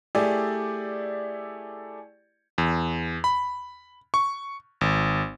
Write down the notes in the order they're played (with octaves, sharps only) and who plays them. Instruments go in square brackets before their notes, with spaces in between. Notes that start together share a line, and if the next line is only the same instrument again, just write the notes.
[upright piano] A3 E4 G4 G#4 D5
[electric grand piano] E2
B5
C#6
G#1